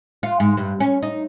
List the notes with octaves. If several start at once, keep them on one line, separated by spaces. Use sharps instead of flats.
F4
G#2
G2
C#4
D#4